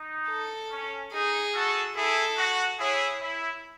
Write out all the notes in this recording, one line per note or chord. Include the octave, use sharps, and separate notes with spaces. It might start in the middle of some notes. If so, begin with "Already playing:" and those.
Already playing: D#4
A4
C#4
D#4 G#4
F#4 A4
E4 G#4 A4
F#4
E4 G#4 C#5
E4